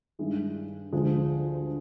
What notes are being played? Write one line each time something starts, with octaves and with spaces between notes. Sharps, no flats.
G2 D#3 G#3 E4
D2 D3 F3 G#3